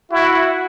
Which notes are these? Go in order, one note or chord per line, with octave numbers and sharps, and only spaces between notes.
E4 F#4